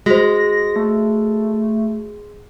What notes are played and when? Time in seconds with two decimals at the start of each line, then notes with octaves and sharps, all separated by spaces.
0.06 G#3 F#4 C5 A#6
0.76 A3